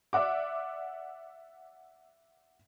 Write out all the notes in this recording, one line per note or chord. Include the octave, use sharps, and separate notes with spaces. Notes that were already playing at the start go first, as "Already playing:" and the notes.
D5 E5 F#5 D6